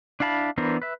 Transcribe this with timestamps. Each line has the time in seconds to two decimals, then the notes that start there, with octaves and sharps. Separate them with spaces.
0.20 D4 E4 F5 A5 B5
0.58 E3 B3 D4 A#4 C5
0.82 B4 E5